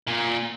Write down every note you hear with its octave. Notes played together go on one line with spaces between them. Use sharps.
A#2